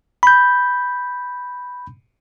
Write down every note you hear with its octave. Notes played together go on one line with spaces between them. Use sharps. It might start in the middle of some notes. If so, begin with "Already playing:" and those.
B5 G6